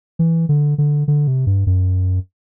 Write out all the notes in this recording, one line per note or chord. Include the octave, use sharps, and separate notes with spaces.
E3
D3
D3
D3
C3
G2
F#2